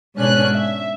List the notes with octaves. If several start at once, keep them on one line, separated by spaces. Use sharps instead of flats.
G#2 B2 C#4 D4 G#5 F#6
E5